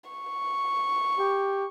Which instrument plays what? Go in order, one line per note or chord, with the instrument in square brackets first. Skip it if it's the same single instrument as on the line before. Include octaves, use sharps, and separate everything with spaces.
[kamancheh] C#6
[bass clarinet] G4